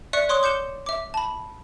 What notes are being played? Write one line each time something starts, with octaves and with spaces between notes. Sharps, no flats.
D5 E5 C#6 F#6 C#7
C#5 C6 C#6 D#6 F#6
D6 G6 C#7 E7 G7
E5 D6
A5 B5